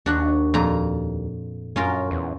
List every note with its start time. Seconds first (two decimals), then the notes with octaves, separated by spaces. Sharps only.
0.06 D#2 D4 F#4 F#5
0.54 F2 A#2 A#5
1.76 F#2 C#4 F4 A#4
2.11 E2